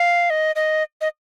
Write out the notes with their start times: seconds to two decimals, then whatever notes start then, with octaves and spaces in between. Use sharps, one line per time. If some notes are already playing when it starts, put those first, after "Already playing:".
Already playing: F5
0.30 D#5
0.55 D#5
1.01 D#5